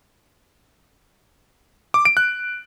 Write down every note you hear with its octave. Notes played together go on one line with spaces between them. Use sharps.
D6
D7
F#6